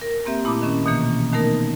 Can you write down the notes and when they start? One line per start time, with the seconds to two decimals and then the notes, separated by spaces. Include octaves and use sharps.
0.01 A#4
0.26 A#3 C4 G4 E5
0.45 A#2 A3 E4 B5 D6 D#6
0.62 D#3 C#4
0.86 B2 D#3 E3 A#3
1.33 D#3 A3 B3 D#4 A#4